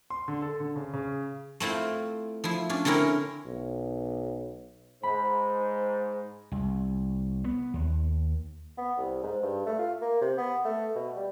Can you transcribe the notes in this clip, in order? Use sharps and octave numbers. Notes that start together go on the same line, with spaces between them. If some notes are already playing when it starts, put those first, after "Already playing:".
C6
D3
A4
D3
C#3
C#3
A3 C4 E4 F4
F3 E4
C#4 D4
D3 C4 C#4 E4 A#4
B1
G#2 C5 B5
C2
B3
D#2
B3
C2
G#2
G2
A3
F4
A#3
C3
B3
A3
B2
G3